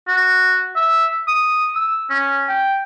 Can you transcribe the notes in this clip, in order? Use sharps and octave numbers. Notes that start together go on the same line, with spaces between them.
F#4
E5
D#6
E6
C#4
G5